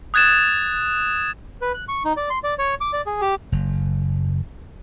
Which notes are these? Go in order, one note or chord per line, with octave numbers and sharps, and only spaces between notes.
D#6 F#6 G#6 A6 E7
B4
F#6
C#6
D#4
D5
C6
D5
C#5
D6
D5
G#4
G4
F#1